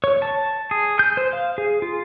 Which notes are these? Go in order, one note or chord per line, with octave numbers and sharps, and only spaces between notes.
C#5
A5
G#4
G6
C5
F5
G#4
F4